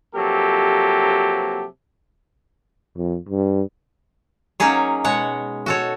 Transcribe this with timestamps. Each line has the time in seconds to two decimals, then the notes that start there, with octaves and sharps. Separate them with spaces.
0.15 C3 F3 F#3 A#3 G4 A4
2.97 F2
3.29 G2
4.60 F#3 A#3 C#4 D#4 G#4 C#5
5.04 B2 G#3 C#5 F#5
5.66 F#4 A4 C#5